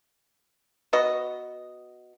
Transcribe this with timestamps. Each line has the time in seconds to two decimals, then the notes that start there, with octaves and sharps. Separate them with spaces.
0.93 B3 F#4 D#5